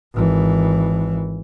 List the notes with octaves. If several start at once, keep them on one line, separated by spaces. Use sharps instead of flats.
G#1 E3